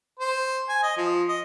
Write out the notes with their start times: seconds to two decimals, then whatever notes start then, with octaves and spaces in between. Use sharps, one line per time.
0.20 C5
0.69 G#5
0.83 D#5
0.97 F3
1.29 D#5